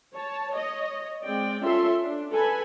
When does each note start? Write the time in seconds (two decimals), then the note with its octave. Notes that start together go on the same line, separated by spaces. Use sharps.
0.14 C#5 A5
0.51 C#5 D#5
1.23 G#3 C4 D5 G5
1.62 C#4 F4 A4 E5 C6
2.03 D4
2.33 A4 B4 G#5 B5